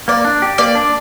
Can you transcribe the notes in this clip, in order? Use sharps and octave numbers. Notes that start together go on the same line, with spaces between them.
A#3 D5
D4
G4
A#3 D5
D4